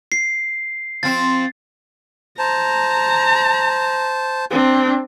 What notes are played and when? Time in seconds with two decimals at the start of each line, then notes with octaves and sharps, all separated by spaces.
0.12 C7
1.03 F3 C4 A6
2.39 C5 A5 A#5
4.50 C4 D4